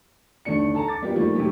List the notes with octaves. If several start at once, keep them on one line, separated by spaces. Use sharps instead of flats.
G1 D#2 A3 D4 C#7
A4 A5 A#5
D6 A6
G3 A#3 B3 F4 G4
A2 D#3 F3 G3 A3 A#3
C3 D#3 F#3 A3 G4